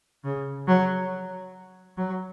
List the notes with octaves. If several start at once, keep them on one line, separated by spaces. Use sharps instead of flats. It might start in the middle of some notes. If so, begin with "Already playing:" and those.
C#3
F#3
F#3